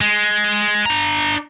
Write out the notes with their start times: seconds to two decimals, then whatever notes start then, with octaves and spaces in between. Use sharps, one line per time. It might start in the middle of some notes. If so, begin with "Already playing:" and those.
0.01 G#3
0.86 D4 A#5